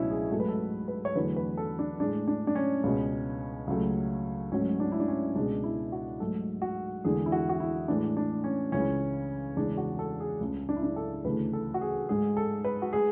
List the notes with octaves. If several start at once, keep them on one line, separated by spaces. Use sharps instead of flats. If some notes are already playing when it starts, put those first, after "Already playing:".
Already playing: C#2 B2 F#3 A3 C#4 D4 E4
G#4
G#2 F#3 A3 A4
B4
A4
B4
C#5
E2 D3 F#3 A3 B4
B4
A4
D4
A2 G#3 D4
D4
D4
C#4
C#2 B2 G#3
C#2 C#3 F#3 A3
G#2 F#3 A3 C#4
D4
E4
D4
C#4
C#2 B2 G#3 D4
E4
F#4
G#2 F#3 A3 A4
F#4
E2 D3 G#3 G#4
E4
F#4
F#4
E4
A2 E3 G#3 D4
D4
C#4
C#2 C#3 E3 G#3 C#4
E2 C#3 G#3 D4
F#4
A4
G#4
C#2 C#3 G#3
D4
E4
D4
A4
D2 C#3 E3 A3 B4
A4
F#4
G#4
G#2 G#3 G#4
A4
B4
F#4
G#3 G#4